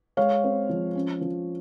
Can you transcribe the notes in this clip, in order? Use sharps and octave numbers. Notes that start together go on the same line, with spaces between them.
G#3 C#5 F5
C4
F3
C#4
F3